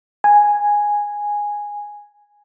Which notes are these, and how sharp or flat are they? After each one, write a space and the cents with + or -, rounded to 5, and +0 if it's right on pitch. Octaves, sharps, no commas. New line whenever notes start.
G#5 -5